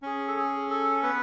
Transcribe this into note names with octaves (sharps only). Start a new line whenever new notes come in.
C#4 G#4
A4
G#4
A4
B3 B4